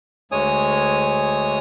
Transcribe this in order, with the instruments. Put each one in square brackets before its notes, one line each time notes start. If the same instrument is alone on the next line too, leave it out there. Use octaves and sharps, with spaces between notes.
[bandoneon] D2 G#3 C#5 G#5 D#6